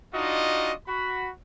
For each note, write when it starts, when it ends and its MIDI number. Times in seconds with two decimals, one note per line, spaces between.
0.14 0.72 62
0.14 0.72 63
0.14 0.72 65
0.14 0.72 66
0.14 0.72 75
0.87 1.29 66
0.87 1.29 83